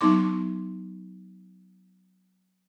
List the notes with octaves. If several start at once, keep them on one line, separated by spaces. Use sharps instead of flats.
F#3 B3 D#4 C6 D6